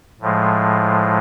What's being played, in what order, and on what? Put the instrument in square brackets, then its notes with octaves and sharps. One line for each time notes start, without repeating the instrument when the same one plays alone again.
[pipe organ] A2 F3 G#3